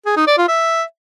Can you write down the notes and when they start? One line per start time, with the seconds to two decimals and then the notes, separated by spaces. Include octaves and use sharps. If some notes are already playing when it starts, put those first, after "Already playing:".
0.06 G#4
0.17 D#4
0.27 D5
0.38 F4
0.48 E5